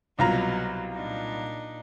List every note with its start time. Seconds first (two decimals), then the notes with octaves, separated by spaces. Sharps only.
0.19 C2 B2 F#3 F4 A#5
0.94 A#2 D4 D#4